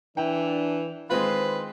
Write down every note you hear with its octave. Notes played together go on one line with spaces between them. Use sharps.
E3 D4 G5
D#3 G#3 C4 F4 B4 C5